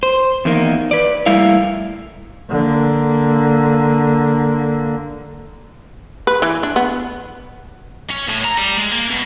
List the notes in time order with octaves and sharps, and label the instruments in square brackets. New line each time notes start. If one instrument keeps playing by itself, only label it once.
[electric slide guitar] C5
E2 D#3 A#3
B4 D5
G3 A3 A#3 E4 F5
[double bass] D3 A#3
[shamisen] B4
E3
D4
B3
[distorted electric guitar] C#4
A2
A#5
G3
G#3
A#3
B2